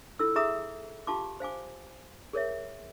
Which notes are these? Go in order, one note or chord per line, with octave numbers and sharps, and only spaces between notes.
E4 F4 A4 E6
G#4 E5 A#5 D#6 E6
F4 G4 F5 A5 C6 D6
C5 F5 G#5 D6
G#4 A#4 C#5 E5